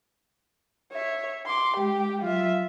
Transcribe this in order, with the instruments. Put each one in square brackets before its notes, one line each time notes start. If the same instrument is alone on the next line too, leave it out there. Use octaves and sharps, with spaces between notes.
[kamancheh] C#5 E5
C6 D6
[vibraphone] G#3 [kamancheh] G4 G5
[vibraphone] F#3 [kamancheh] F4 E5